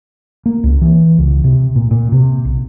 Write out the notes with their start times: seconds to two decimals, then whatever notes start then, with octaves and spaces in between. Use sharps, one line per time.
0.46 A#3
0.63 C#2
0.81 E3
1.18 C#2
1.44 C3
1.76 A#2
1.91 A#2
2.12 C3
2.45 B1